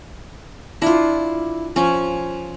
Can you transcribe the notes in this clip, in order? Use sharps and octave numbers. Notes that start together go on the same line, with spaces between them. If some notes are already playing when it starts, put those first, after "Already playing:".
D4 E4 F4
F3 C#4